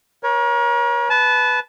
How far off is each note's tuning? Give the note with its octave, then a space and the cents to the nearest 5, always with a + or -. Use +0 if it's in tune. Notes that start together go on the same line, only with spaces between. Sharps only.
A#4 +40 C#5 +0
B4 +0 A5 -25